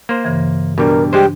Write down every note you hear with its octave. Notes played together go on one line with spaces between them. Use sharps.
A#3 C5
G2 C#3 E3
B2 G3 D4 A#4
G3 G#3 G4 C5